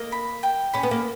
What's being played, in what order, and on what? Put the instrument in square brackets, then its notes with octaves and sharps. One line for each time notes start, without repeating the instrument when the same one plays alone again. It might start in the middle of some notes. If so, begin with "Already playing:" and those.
Already playing: [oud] A#3 [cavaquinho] D#5
[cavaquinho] B5
G5
[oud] C#4 [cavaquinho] B5
[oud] B3
A#3